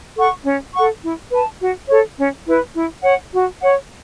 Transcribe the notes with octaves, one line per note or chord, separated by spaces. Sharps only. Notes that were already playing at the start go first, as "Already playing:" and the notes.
A4 F#5 C#6
C#4
A4 F#5 C#6
E4
B4 A5
F#4
A4 C#5
C#4
E4 B4
E4
C#5 F#5
F#4
C#5 F#5